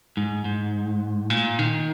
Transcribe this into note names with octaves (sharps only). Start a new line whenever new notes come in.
G#2
G#2
A#2
D#3